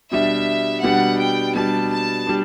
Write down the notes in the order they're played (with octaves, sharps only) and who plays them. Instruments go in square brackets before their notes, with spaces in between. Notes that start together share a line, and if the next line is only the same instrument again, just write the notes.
[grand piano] B2 G3 D4 [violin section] E5
[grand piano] B2 G3 D4 [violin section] F#5
[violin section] G5
[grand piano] B2 G3 D4 [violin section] A5
[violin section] A5
[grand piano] G3 D4